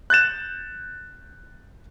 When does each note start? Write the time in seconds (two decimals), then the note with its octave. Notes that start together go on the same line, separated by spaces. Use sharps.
0.10 F#6 G6 A6 E7